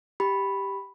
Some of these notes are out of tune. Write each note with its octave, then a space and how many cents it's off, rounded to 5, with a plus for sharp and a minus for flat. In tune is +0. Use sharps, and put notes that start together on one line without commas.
G4 +0 B5 +0